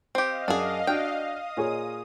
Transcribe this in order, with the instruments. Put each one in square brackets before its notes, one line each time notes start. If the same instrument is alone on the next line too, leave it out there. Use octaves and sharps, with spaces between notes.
[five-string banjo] C4 G4 [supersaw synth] D#5 F5
[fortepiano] F#2 [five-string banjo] D4 G#4
[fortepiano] D4 F#4 [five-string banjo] G5
[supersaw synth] D#6
[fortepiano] A#2 G#4 C#5